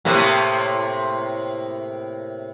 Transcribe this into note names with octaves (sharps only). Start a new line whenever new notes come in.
A2 C3 A#3